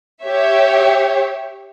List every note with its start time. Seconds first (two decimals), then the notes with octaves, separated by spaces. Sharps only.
0.23 G4 C#5 E5